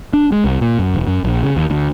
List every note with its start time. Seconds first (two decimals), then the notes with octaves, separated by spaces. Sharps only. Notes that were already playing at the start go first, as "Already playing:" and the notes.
0.13 D4
0.32 G#3
0.44 C2
0.61 A#2
0.79 F#2
0.95 E1
1.07 F#2
1.24 A#1
1.43 C#3
1.57 D#2
1.70 D2